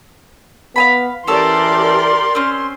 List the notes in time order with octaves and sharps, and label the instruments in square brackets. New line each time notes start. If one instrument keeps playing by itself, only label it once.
[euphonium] B3 [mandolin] F5 G#5 B5
[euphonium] E3 [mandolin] C#4 A4 [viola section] G4 A#4 D5 [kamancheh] C6
[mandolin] C4 C#4